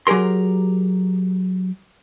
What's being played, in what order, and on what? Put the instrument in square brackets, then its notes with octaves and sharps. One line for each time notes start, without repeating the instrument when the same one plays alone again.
[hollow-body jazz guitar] F#3 G4 G#4 A#4 C6